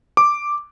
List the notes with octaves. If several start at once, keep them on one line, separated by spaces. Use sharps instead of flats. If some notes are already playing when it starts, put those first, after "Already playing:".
D6